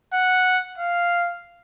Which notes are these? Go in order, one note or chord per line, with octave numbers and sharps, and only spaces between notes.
F#5
F5